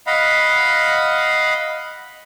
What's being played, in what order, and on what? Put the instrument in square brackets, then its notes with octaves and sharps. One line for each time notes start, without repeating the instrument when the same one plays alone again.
[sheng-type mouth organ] D#5 F5 F#5 B5